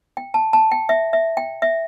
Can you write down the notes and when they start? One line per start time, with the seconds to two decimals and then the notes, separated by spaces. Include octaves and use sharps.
0.17 G5
0.34 A5
0.53 A5
0.71 G5
0.89 E5
1.13 E5
1.37 G5
1.62 E5